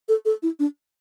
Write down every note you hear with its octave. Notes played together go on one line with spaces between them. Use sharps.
A4
A4
E4
D4